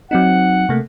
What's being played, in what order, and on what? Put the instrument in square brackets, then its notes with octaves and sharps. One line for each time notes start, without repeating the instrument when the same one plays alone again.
[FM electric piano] F#3 C4 D#4 [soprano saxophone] F#5
[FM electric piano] C3 A3 A#3